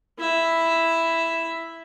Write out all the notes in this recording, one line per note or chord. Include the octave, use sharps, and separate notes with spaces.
E4 E5